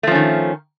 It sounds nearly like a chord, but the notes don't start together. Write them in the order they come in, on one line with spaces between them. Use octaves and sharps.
A3 F3 C#4 D#3